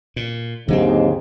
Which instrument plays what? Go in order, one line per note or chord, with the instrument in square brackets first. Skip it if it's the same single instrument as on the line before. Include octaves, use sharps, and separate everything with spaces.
[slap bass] A#2
[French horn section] D#2 [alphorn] G#2 [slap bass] D3 F#3 C4